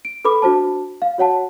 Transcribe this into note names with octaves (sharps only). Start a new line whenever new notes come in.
D7
A4 B4 B5 D6
D4 F#4 C5 A5
F5
F#4 C#5 F#5 A5